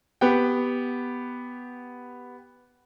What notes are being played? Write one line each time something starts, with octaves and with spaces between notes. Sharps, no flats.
B3 G4 F#5 G5